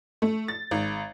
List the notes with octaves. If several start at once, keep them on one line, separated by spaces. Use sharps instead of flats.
A3
A6
G#1